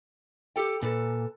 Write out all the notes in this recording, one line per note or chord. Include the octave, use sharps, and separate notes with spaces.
G4 A4 G5
A#2 A4 B4